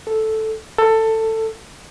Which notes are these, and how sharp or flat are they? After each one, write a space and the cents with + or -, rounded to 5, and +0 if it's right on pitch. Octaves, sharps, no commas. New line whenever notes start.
A4 -5
A4 +15